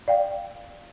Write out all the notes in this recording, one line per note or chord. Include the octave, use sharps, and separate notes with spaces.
D5 F5 G5